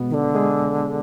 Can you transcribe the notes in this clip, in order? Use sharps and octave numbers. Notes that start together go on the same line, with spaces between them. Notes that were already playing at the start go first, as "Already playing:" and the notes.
Already playing: B2 G#3 B3
D#3
D3
G#3 G#4